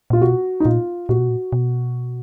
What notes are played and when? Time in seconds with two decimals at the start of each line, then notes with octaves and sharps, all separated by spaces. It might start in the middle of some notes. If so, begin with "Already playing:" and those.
0.10 A#2 F4
0.22 B2 F#4
0.60 D#4
0.65 A#2 F4
1.09 A#2 F#4
1.19 B2
1.29 A#2
1.52 B2